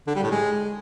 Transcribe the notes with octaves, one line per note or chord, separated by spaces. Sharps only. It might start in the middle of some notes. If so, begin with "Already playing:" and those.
D3
G3
A2
G#3